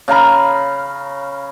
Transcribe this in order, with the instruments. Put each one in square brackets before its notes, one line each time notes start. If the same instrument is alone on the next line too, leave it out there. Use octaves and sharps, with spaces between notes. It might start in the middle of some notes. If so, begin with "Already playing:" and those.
[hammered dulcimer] C#3 F5 A#5 B5